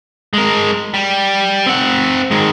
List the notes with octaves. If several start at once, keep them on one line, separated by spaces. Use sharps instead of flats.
G#3 A#4
G3
C4 F#5
D#3 G#3